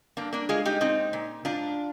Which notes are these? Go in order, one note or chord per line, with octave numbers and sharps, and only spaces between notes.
G2 A#3 D4
A#3 D4
G#3 F4 G#4
D#4 G4
A#2 C4 D#4
A#2
G#2 D4 F4